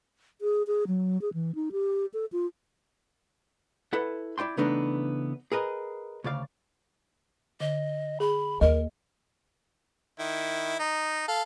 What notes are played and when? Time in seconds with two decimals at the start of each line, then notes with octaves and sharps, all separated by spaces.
0.41 G#4
0.67 G#4
0.87 F#3
1.22 G#4
1.34 E3
1.55 D#4
1.72 G4
2.14 A4
2.32 F4
3.93 E4 A4 B4 F#5
4.38 E4 D5 G5 C6
4.57 C#3 E3 A3 B3 D4 D#4
5.52 G#4 A#4 B4 D#5
6.24 D2 C#3 D5 F5
7.60 D3 D#5
8.20 G#4 B5
8.61 D#2 A#4 D#5
10.19 D#3 E4
10.79 D#4
11.28 A4 F5